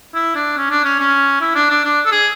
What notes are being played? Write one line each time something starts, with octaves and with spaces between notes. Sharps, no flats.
E4
D4
C#4
D4
C#4
C#4
E4
D4
D4
D4
A4
G#4